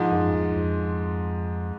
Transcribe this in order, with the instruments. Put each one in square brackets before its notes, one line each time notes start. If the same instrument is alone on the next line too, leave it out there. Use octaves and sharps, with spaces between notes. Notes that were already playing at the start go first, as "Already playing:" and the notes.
Already playing: [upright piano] G#2 F3 G#3
[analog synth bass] F#2
F2
F2